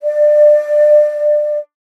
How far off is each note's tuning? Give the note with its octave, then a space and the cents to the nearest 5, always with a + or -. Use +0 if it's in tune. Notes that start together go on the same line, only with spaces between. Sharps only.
D5 +25